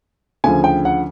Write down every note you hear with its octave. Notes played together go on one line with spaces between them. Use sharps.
D2 C#3 F3 G#5
G5
F#5